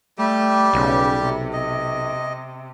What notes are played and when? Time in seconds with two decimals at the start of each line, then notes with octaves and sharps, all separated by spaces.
0.19 G3 A3 G4
0.74 B1 C#3
1.23 C3
1.53 D#5